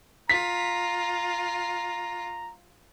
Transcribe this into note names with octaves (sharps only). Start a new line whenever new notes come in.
F4 A#5 B6